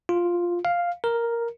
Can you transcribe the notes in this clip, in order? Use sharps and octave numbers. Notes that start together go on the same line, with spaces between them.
F4
F5
A#4